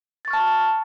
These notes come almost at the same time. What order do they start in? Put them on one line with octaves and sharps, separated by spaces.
A6 C#6 F6 A5